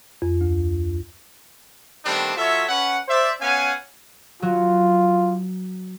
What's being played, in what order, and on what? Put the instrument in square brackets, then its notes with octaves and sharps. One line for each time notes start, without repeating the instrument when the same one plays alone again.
[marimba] F2
D2
[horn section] D#3 G3 A3 B3 C4 D4
F#3 F4 A4 C#5 E5
C#4 B4 F#5
C5 D5 E5
B3 C#4 F5 F#5 G#5
[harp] F#3 F#4 [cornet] F4